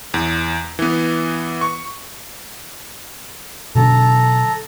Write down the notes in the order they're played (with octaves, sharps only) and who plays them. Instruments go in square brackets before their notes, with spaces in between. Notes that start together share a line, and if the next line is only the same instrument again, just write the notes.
[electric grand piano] E2
E3 B3
C#6
[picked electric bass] B2 D3 F#3 [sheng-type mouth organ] A4 A#5